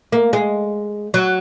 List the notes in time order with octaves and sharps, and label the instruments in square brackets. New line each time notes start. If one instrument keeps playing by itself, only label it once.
[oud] A#3
G#3
F#3